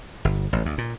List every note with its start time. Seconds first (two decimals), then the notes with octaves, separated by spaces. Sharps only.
0.25 G1
0.53 A1
0.65 D2
0.78 A#2